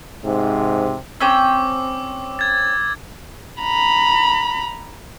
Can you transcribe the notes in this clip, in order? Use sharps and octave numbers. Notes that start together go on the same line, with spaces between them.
G#2 C3
C4 C#4 G5 D6 E6
G#6 A6
A#5 B5